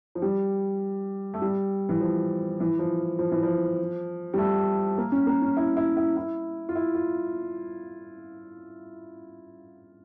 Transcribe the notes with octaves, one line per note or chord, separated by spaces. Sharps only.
F3
G3
A3
G3
E3
F3
E3
F3
F3
E3
F3
G3
A3
A#3
C#4
A#3
C#4
E4
E4
E4
E4
F4
E4
F4